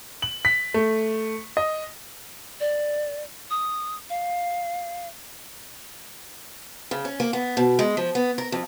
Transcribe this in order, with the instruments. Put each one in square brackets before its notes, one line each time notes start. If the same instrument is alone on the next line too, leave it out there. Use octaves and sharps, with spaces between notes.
[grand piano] F#7
B6
A3
D#5
[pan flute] D5
D#6
F5
[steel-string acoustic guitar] C#3
C#4
A#3
B3
B2
G#3
F3
B3
A#4
F2